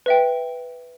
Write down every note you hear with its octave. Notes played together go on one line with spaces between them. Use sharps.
B4 E5 G5